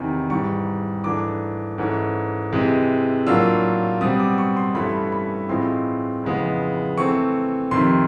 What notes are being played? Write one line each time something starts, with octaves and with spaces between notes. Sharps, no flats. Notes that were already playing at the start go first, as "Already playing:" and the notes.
Already playing: E2 C3 D#3
G#2 E3 G3 C#6
G#2 E3 A3 D4 D6
G#2 E3 A3 C#4
C3 E3 G#3
A2 F#3 A#3 D4 F4 E6
B2 G3 C4 D#6
D6
C#6
C6
G2 E3 A3 C#4 E4 B5
B5
A2 E3 G#3 C4 F4 C6
F2 C#3 E3 G#3 B3
E3 A3 C4 C#6
F2 C3 D#3 C6